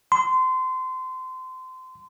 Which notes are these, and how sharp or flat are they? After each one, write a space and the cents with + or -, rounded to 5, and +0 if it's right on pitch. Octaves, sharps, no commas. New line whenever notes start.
C6 -25